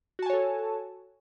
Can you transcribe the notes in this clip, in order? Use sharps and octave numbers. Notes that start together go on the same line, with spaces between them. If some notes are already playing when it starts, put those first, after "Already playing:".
F#4 A4 C#5 G#5 A5